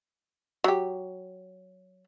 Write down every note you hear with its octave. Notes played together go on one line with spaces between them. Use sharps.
F#3 G4